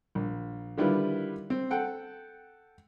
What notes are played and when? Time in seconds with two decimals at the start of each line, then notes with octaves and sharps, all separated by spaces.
0.15 A#1
0.77 D3 D#3 G3 E4 F4 B4
1.50 C4
1.71 A4 F#5 G5